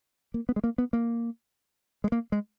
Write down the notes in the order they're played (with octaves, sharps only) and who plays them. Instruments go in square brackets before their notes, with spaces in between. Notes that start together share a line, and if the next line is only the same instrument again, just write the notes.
[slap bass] A#3
B3
G#3
A#3
B3
A#3
G#3
A#3
G#3